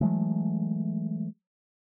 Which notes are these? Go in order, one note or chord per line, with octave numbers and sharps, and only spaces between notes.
E3 F#3 G#3 A3